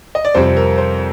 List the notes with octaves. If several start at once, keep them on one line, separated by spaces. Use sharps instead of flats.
D#5
D5
F2 C3 G3 C4 C5
A#4
C5